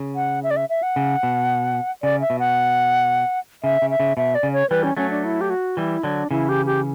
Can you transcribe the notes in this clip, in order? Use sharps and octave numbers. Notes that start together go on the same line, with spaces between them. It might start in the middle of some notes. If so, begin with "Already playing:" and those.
Already playing: C#3
F#5
E5
D5
E5
E5
F#5
C#3
B2
C#3 D5
E5
B2
F#5
C#3 E5
C#3
E5
C#3
B2 E5
D5
C#3
C#5
E3 G3 B4
C#4
F#3 A3 C#4
D4
E4
G4
F#4
E3 G3 E4
D3 F#3 D4
C#3 E3 E4
G4
G4